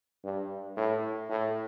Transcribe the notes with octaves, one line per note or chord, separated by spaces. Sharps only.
G2
A2
A2